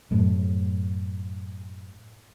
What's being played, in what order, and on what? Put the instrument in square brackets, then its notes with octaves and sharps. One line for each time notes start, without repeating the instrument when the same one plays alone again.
[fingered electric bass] F#2 A2